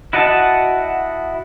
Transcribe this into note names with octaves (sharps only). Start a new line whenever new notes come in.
E4 F#4 D#5 F#5 A5